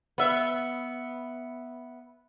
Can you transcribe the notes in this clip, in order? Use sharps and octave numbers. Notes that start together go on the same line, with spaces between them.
B3 E5